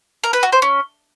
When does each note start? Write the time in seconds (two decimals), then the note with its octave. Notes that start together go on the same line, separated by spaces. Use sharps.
0.24 A#4
0.33 B4
0.43 F#4
0.52 C5
0.62 C#4